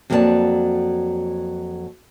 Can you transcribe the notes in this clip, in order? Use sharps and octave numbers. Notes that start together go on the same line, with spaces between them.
F2 F#3 A#3 F4 D5 A5